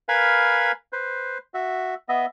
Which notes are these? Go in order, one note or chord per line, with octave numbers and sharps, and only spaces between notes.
A#4 B4 F5 G#5 B5
B4 C5
F#4 E5
B3 D#5 E5